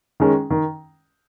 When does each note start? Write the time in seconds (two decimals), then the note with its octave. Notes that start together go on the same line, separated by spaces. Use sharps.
0.20 D#3 G#3 C#4
0.50 D#3